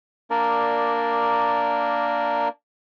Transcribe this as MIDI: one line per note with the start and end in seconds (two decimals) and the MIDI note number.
0.30 2.48 58
0.30 2.48 62
0.30 2.48 70
0.30 2.48 74